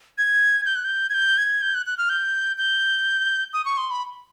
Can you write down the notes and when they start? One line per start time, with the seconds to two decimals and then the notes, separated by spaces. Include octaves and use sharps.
0.18 G#6
0.66 G6
0.75 F#6
0.84 G6
1.10 G#6
1.14 G6
1.38 G#6
1.62 G6
1.75 F#6
1.86 F#6
1.98 F6
2.09 G6
2.58 G6
3.53 D#6
3.65 C#6
3.77 C6
3.91 B5